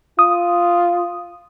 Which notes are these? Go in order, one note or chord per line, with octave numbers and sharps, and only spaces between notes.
F4 D#6